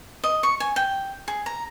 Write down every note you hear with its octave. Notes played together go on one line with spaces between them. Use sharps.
D#5
C#6
G#5
G5
G#4
A#5